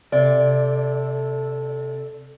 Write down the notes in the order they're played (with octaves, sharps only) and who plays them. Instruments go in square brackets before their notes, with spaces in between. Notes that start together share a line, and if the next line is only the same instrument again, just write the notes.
[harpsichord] C3 [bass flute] A4 [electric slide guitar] D5